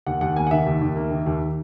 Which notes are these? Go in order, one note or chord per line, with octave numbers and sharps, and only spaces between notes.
D#2 F#5
D#2 F#5
A#3 G#5
F#5
D#3 E5
D#2
D#2
A#3
D#3
D#2